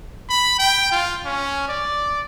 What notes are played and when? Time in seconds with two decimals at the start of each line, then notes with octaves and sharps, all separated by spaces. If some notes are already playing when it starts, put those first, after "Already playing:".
0.29 B5
0.59 G5
0.92 F4
1.25 C#4
1.68 D5